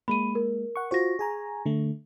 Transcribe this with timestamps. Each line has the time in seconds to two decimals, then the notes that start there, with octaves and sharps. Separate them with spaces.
0.08 G#3 A#3 B5 D#7
0.35 A#4
0.76 F#5 C#6
0.91 F4 F#4 C5 C#6 A#6
1.19 G#4 G#5 A#5
1.66 D3 A3